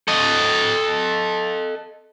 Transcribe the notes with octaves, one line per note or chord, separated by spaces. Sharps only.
A4 D#5